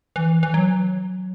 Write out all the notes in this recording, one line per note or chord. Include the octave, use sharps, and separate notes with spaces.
E3
E3
F#3